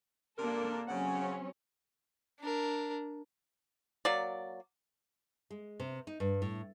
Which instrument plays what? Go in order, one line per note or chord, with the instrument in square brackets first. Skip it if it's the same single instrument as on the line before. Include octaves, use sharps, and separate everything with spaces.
[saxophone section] G2 C3 A#4 [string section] A#3 D4 A4
[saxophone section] C#3 F#5 [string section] F#3 C4 C#4
[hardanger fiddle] D4 A#4
[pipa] F#3 A#3 D5
[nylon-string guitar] G#3
C3
D#4
G2
A2